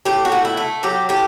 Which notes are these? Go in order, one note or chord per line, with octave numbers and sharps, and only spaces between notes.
A2 G4
F#4
A2
E4
A3
F#3 G4
A2 G4